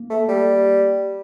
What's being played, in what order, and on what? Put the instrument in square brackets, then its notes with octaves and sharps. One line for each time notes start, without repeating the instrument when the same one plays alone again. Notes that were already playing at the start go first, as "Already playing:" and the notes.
Already playing: [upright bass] A#3
[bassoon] A3
G3